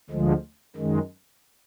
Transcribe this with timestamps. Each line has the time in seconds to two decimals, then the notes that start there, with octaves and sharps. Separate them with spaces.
0.10 D2 D3 F3 G#3
0.76 F#2 D#3 G#3